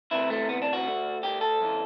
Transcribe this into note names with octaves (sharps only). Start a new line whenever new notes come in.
D2 C3 E3 E4
A3
B3
D4
F#4
D2 D3
G4
A4
F#2 E3